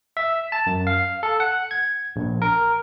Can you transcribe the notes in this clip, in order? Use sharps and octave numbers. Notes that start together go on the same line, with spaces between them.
E5
A5
F#2
F5
A4
F#5
G#6
A#1
A#4